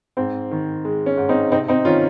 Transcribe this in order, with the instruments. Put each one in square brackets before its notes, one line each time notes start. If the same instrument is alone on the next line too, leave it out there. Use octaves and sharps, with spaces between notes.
[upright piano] G#2 C4
D#3
G#3
C#4
G#2
C4 D#4
C3 C4 D#4
C4 D#4
D#3 C#4 F4